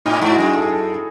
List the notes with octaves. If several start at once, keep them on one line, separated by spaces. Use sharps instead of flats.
A2 D#4
G#2 E4
F#4
F#2 G#4
A4
G#4
A4
A4